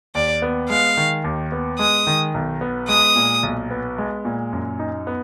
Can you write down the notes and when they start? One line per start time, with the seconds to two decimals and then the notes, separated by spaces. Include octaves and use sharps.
0.15 D#2 D5
0.42 B3
0.70 G#3 F5
0.97 D#3
1.24 D#2
1.52 B3
1.79 G#3 D#6
2.07 D#3
2.34 B1
2.61 B3
2.88 G#3 D#6
3.16 A#2
3.43 B1
3.71 B3
3.98 G#3
4.25 A#2
4.53 F#2
4.79 D#4
5.07 B3